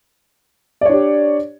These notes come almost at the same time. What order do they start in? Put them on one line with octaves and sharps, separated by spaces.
D5 C#5 D4 G4